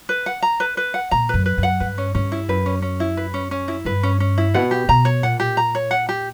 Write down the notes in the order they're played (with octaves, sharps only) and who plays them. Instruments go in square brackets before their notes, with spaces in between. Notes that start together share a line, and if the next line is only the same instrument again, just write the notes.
[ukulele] B4
F#5
A#5
B4
B4
F#5
[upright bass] A#2 [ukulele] A#5
[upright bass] F#2 [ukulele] B4
[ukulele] B4
[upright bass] F#2
[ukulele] F#5
[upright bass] G2 [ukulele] B4
[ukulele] C#4
[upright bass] G2 [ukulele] C#4
[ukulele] E4
[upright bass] F#2 [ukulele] B4
[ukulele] C#4
C#4
E4
B4
C#4
C#4
E4
[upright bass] G2 [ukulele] B4
[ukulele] C#4
C#4
E4
[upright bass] B2 [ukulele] F#5
[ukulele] G4
[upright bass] B2 [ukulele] A#5
[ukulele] C#5
[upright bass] A#2 [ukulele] F#5
[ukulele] G4
A#5
C#5
F#5
G4